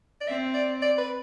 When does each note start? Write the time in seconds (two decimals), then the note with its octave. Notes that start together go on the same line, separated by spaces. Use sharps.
0.21 D5
0.28 C4 E5
0.54 D5
0.82 D5
0.98 B4